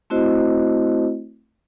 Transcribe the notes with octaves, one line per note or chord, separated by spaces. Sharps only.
A3 C4 E4 F#4 C5 D#5